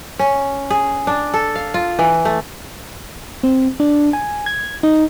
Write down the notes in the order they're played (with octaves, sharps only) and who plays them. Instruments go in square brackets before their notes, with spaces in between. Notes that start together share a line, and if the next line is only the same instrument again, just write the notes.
[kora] C#4
G#4
D4
A4
F5
F4
E3
A3
[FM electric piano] C4
D4
G#5
G#6
D#4